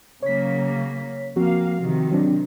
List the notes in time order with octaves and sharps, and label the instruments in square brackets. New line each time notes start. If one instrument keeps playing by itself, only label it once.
[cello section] C#3 F#3 A#3 [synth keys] C#5 B6
[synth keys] F3 C4 F#4 [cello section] A#3 F5
[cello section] C3 D#3
[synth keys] F#3 C4 D4